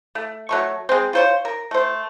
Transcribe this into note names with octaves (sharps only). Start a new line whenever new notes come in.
A3
F#3 A3 C#6
G#3 C4
F4 C5 C#5
A#4
A3 C5